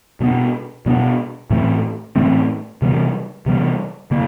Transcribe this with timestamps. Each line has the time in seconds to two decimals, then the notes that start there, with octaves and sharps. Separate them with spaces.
0.20 B2 G#3 B3 D4
0.86 B2 G#3 B3 D4
1.50 A2 E3 A3 C4
2.16 A2 E3 A3 C4
2.82 C3 E3 G3 B3
3.46 C3 E3 G3 B3
4.11 C#3 A#3